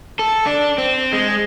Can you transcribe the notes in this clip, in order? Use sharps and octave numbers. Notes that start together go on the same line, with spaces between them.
A4
D4
C4
G#3